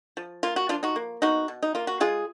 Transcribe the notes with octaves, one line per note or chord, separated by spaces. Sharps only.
F3
A#3 F4
F#4
F3 D4 F4
D#4 F#4
A#3
B2 D#4 F#4
B2
D#4
A#3 F4
F#4
G#3 F4 G#4